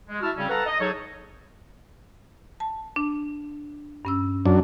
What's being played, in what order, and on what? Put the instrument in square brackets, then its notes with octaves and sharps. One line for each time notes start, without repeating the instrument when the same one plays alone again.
[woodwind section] G#3
E4 F#4 E5 A5 E6 F6
C#3 G3 C4 C#4
A4 B4 F5 F#5 A5 A#5
D#5
F#3 D#4 G#4 A4 C#5
[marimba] A5
D4
G2 C#4 E6
[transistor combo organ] F#2 D4